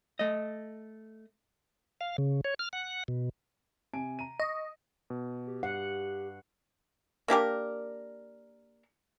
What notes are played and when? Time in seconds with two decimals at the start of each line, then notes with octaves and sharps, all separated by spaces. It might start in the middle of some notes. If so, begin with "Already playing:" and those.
0.19 A3 D#5
2.01 F5
2.18 C#3
2.45 C#5
2.59 F6
2.73 F#5
3.08 B2
3.93 C3 G#5 D7
4.19 A#5 D#7
4.40 D#5 C#6
5.10 B2
5.47 G4
5.63 G2 F#5 C7
7.28 A#3 D4 G4 A#4